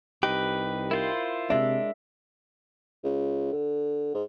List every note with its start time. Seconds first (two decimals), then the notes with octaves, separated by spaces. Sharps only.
0.23 C2 D#4 G4 B4
0.91 E4 F4 A#4 C5
1.50 C3 G#3 D4 E5
3.04 C#2
3.52 D3
4.14 G#2